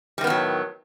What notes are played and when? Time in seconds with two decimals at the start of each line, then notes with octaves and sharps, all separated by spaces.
0.18 G3
0.21 D#3
0.24 B3
0.27 A2
0.30 F#3